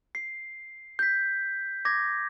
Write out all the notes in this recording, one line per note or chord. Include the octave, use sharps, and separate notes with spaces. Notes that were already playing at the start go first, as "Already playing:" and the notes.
C7
G6 B6
D6 G#6 A#6